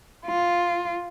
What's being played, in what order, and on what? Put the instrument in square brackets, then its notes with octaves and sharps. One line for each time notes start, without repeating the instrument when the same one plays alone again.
[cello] F4